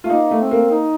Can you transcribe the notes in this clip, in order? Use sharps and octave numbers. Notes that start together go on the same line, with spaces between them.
A3 F4
A#3 D#4
A3
C4
A#3
D#4